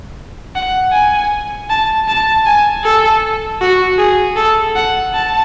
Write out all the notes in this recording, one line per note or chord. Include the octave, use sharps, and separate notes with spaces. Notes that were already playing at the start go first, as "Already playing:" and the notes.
F#5
G#5
A5
A5
G#5
A4
F#4
G#4
A4
F#5
A5